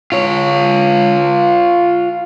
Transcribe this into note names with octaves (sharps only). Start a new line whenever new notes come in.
F4 C#5